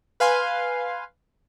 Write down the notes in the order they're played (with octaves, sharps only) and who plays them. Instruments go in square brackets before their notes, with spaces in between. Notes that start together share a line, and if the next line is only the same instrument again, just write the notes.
[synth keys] B4 F5 G#5 C6